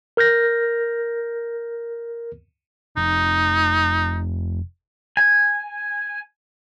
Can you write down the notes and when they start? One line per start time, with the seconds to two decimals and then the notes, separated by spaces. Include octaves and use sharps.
0.17 A#4 F6 G6 A#6
2.97 F1 D#4
5.17 G#5